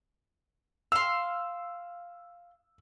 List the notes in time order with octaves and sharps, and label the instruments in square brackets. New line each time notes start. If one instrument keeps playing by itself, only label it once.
[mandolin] F5 C6 [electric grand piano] E6